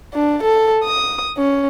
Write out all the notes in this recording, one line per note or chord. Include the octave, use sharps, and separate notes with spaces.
D4
A4
D#6
C#4